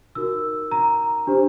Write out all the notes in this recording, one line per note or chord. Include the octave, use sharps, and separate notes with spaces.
D#4 F#4 A#4 E6
A#5
D4 G4 C5